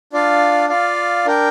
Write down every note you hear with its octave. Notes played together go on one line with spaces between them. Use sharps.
D4 F4 D5 F5
F4 D5 F5
D4 A#4 G5